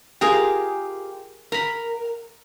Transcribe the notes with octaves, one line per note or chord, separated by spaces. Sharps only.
F4 G4 G#4 A#4 A#5
A#4 A#5 B5